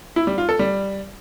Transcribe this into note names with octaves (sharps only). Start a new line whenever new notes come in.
E4
G3
F4
A4
G3